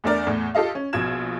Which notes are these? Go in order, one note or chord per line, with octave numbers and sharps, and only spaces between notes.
E2 A3 D4 A#4 D5 F6
E2 A2
F4 G4 A4 D#5 F5
C#4
A#1 B2 F4 G#6 E7